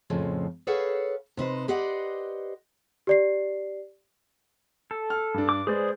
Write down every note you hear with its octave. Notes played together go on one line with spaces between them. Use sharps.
F2 A2 C#3 F3
G#4 A4 B4 C#5 F5 F#5
C3 D#4 B4 C5
G4 B4 C5 D5 D#5 F#5
G4 D5 C7
A4
F6
G2 D4
D6
G#3 G#4 B4 C5 D5